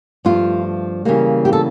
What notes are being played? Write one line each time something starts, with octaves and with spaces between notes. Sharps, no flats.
G2 F3 A3 F4
C#3 E3 G3 A#3
G4
A4